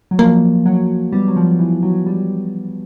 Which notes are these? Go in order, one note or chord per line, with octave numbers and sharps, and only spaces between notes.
F#3
F3 A#3
F#3
G3 B3
F#3
F3
E3
F#3
G3